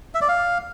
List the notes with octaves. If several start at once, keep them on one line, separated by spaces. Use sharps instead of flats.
E5
D5
F5